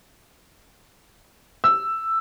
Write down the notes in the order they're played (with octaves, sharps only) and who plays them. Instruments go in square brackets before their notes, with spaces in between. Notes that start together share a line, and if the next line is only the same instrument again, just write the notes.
[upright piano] E6